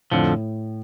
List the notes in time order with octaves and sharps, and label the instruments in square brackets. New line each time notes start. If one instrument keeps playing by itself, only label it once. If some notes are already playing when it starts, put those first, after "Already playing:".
[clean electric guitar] F2 D3 F3 [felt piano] A2